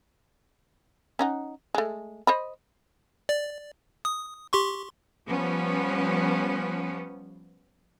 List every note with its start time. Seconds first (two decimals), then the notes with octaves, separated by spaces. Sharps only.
1.19 C#4 D#4 F#5
1.75 G#3 A3
2.27 C5 D#5 B5
3.29 D5
4.05 D#6
4.53 G4 C6 C#6
5.27 F3 G3 B3 C#4